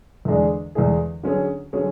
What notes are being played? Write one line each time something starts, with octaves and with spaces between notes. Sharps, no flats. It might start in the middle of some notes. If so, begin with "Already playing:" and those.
E2 D3 G#3 D4 G#4
E2 D3 G#3 D4 G#4
D3 F#3 C#4 G#4 C#5
D3 F#3 C#4 G#4 C#5